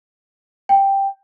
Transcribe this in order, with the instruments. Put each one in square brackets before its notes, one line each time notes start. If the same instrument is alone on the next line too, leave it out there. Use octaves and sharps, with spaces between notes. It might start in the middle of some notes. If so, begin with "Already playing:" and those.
[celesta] G5